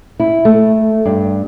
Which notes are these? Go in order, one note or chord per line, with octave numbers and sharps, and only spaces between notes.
E4
A3
G2